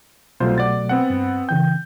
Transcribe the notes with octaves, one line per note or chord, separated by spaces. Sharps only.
C2 B2 F#3 A3 F4 C5
D5 F#5 A6
B3 C4 F#5
G2
C#3 E3 G5 G6